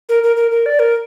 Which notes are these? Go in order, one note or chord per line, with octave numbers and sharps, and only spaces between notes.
A#4
A#4
A#4
A#4
D5
A#4